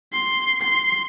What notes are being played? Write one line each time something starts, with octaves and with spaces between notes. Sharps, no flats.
C6
C6